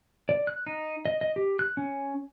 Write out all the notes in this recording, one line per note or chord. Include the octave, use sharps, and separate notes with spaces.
D5
F#6
D#4
D#5
D#5
G4
F#6
C#4